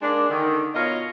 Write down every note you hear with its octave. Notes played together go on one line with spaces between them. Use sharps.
G#3 A#3 D4
D3 D#3
B2 F4 A#4 C#5 D#5